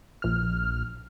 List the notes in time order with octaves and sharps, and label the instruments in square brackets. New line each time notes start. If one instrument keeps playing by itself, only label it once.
[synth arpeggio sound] A#1 F6